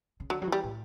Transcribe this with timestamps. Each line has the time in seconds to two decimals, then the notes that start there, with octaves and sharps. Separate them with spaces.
0.20 C#3
0.30 D3 F#3
0.42 F#3
0.47 E3
0.52 G3
0.64 A2